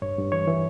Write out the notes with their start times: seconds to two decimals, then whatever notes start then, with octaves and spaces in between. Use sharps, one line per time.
0.02 G2 C#5
0.18 G2
0.32 E3 C#5
0.47 E3